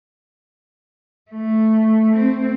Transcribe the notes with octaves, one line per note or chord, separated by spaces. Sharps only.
A3
C4